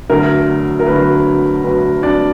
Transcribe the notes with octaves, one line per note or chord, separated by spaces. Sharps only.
D2 D3 F#3 A#4
A#4
D2 D3 F#3 B4
D2 D3 F#3 B4
D4 D5